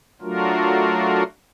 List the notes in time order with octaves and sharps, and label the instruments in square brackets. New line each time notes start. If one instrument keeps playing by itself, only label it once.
[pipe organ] F#3 A3 D4 F4 F#4 A#4